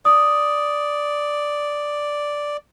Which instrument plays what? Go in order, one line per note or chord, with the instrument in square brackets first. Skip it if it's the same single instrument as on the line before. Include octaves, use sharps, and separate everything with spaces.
[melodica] D5 [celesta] D#6